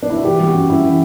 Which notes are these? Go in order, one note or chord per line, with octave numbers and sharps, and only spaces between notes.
D4
E4
F#4
E3 G4
G3
F#4
F#2
F#2 E4
E3